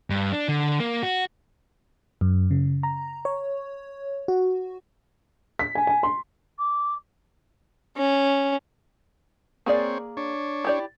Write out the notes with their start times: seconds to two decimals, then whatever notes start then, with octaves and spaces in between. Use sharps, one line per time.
0.10 G2
0.33 D4
0.49 D3
0.80 A#3
1.03 F#4
2.21 F#2
2.51 C#3
2.83 A#5
3.25 C#5
4.28 F#4
5.59 B6
5.75 G#5
5.87 G#5
6.03 C6
6.59 D6
7.97 C#4
9.66 A#3 C4 G#4 C#5 D5
10.17 D4 C#5
10.64 E4 G4 D5